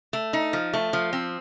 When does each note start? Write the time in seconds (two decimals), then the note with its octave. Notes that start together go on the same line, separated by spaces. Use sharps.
0.13 A3
0.33 D#4
0.53 F3
0.73 A3
0.93 F3
1.13 C4